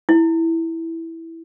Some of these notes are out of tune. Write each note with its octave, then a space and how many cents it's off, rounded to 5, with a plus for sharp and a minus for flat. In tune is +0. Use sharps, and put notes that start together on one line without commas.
E4 -5